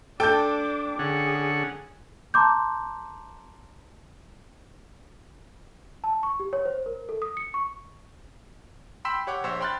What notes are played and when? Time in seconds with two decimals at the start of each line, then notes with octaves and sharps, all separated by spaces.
0.20 D4 A4 G5 A5 D6 G6
0.99 D3 C#4 G#4 F#5
2.34 A5 A#5 C6 D6 G6
6.04 A5
6.23 C#6
6.40 G4
6.53 C#5
6.65 C5
6.86 A#4
7.09 A4
7.22 D#6
7.37 C#7
7.54 C#6
9.05 G5 B5 C6 E6 B6 E7
9.27 G4 C#5 F#5 D6
9.44 A#1 C5 C#5 E6
9.61 G5 B5 C6 F6 F#6 A6